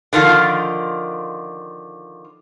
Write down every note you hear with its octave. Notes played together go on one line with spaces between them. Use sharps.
D3 D#3 F3 F4